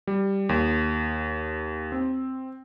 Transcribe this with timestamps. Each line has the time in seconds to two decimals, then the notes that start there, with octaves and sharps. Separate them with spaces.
0.07 G3
0.49 D#2
1.92 C4